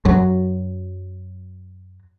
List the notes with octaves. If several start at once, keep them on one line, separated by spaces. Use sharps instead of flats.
F#2 F#3